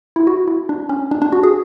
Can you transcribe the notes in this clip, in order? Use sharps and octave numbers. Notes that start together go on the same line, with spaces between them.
E4
F#4
E4
D4
C#4
D4
D4
F#4
G#4